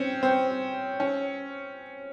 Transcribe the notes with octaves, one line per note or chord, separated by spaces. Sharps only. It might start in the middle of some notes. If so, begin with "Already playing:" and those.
Already playing: C4 C#4
C4
C#4